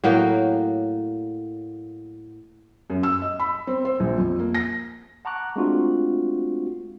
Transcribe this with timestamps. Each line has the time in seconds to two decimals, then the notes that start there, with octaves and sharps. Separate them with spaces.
0.04 A2 F#3 A#3 G5
2.90 F#2
3.03 E6
3.22 D#5
3.39 B5
3.67 C4
3.85 C5
4.00 A#1
4.18 F2
4.39 A#3
4.55 A#6
5.25 F#5 A5 A#5 C#6 D6 F#6
5.56 G#3 A3 C4 D4 F4 F#4